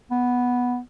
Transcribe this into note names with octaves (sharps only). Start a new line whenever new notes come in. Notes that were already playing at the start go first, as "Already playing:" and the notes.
B3